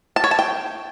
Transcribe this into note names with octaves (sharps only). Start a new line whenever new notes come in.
A5
C#5
A5
G5